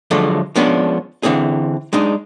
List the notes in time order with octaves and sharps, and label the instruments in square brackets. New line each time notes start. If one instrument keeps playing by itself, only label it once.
[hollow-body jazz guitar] D3 F3 F#3 G#3 A3
F3 G#3 B3 C#4 D4
D3 E3 C4 G#4
G#3 D4 D#4